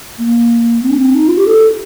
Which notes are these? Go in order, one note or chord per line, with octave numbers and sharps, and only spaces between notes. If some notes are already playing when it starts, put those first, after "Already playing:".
A#3
C4
D4
C4
D#4
F4
G4
A4